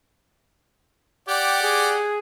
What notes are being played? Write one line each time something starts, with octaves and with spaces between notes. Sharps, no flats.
G4 D5 F#5 G5
G#4